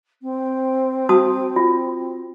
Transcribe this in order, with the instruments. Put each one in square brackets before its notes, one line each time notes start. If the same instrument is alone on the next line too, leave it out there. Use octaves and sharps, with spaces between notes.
[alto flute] C4
[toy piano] F#4 A5 D#6
F4